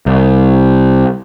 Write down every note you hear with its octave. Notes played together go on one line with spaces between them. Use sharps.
C2